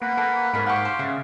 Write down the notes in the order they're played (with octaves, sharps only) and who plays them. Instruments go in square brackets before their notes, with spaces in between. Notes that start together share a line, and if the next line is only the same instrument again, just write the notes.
[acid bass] A#3 [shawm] B4 [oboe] F#5
[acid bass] A#3 [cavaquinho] A4
[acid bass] G#2 [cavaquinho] D#4 A#4 C#5 [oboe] B5
[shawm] G4 [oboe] F5 [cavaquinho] F#5 G#5 C#6
[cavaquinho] C5
[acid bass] C#3 [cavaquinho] E5 F#5